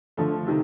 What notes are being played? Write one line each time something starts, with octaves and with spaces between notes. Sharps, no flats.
D3 F3 A3
C3 D#3